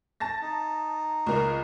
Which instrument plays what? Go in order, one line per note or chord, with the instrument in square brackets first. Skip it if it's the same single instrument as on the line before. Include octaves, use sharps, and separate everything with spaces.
[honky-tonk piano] A5 A6 A#6
[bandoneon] D#4
[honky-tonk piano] C#2 A#4